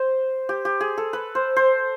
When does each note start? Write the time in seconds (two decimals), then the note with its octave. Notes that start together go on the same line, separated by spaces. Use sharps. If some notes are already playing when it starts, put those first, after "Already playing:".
Already playing: C5
0.49 G4
0.65 G4
0.81 G#4
0.98 A4
1.13 B4
1.35 C5
1.56 C5